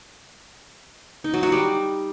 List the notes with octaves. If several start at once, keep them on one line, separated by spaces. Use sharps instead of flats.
D#4
F#3
F#4
G3